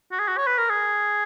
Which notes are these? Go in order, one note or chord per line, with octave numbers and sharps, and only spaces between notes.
F#4
G#4
F#4
C#5
B4
A#4
G#4